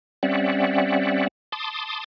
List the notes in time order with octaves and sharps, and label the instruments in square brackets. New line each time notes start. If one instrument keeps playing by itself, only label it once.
[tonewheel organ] G3 C4 C#4 D5 E5 F#5
A5 C6 D6 D#6